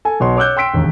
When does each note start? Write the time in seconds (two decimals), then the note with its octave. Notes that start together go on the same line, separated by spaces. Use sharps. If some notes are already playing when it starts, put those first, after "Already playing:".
0.05 A4 G#5
0.20 B1 B2 C#5 C6
0.37 C#5 D6 E6 F#6 G6
0.57 G5 C6 E6 B6 D7
0.73 E1 D#2